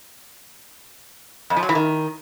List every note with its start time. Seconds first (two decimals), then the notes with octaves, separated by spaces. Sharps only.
1.50 F2
1.56 F3
1.63 F#3
1.69 E3
1.75 D#3